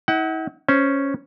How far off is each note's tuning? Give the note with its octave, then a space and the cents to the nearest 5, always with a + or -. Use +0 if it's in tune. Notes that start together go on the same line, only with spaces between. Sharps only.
E4 -45 F#5 +25
C#4 +0 C5 +0